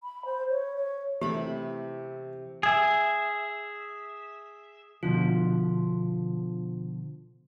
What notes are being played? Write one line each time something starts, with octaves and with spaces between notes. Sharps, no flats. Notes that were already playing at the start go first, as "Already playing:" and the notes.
B5
C5
C#5
C#5
C3 E3 A3 G4 B5
G#4 E5
B2 D3 F3 F4